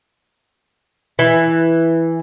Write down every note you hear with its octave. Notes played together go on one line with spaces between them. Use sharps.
E3